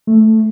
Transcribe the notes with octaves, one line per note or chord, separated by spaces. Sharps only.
A3